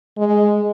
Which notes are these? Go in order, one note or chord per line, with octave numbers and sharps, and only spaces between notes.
G#3